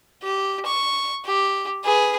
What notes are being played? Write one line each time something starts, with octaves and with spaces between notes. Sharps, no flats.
G4
C#6
G4
G#4 B4